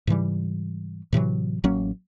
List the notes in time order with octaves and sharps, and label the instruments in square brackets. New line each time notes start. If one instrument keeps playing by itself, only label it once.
[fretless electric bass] G#2 C#3 E3 G3
A2 C3 E3 F#3
A1 F#3 A#3 C#4